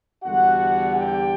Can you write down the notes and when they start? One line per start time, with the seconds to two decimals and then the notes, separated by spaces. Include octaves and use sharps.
0.23 E2 D3 G3 F#4 F#5
0.96 G4 G5